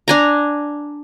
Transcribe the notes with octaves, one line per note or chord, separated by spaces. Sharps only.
D4 G#5 A#5